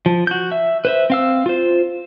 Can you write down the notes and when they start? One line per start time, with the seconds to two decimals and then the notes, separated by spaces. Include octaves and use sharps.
0.06 F3
0.27 F#4 G6
0.52 E5
0.85 B4 C5 E5
1.10 C4 F5 E6
1.46 F4 C5